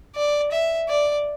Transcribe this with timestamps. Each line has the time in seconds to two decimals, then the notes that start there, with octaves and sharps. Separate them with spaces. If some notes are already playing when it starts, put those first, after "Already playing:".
0.15 D5
0.51 E5
0.89 D5